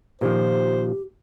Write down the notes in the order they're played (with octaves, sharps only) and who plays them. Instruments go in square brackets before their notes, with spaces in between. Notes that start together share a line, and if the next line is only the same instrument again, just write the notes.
[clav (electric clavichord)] A#2 D#3 F3 [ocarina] G4 [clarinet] C5